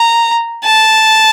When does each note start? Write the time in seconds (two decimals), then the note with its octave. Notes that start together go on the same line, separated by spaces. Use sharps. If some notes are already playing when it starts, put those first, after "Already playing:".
Already playing: A#5
0.64 A5